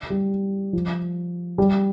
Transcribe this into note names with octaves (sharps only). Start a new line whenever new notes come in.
G3
F3
G3